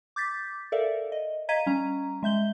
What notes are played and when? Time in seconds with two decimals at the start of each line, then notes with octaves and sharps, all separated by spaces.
0.16 D6 G6 A6 B6
0.72 A4 A#4 D5 E5 F5
1.12 D#5
1.49 D#5 F5 A#5 G#6 B6 D#7
1.66 G3 C#4 A#5
2.23 G#3 E5 G6 G7